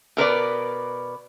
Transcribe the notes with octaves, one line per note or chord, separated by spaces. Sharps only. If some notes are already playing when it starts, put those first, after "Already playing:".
B2 A#4 B4 D5